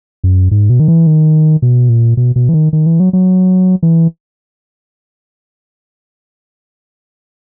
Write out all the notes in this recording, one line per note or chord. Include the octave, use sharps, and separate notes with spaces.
F#2
G#2
B2
D#3
E3
D#3
B2
A#2
B2
B2
E3
D#3
D#3
E3
F#3
F#3
E3